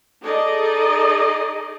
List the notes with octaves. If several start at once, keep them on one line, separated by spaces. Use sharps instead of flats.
D#4 G#4 A4 D5 D#5